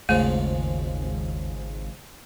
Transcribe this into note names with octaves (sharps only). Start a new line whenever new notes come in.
G#1 D#2 G#2 C#3 F3 A3